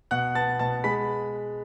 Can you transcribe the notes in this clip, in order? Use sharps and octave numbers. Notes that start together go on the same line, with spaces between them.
B2 F#5 F#6
B3 A5 A6
B2 A5 A6
G#3 B5 B6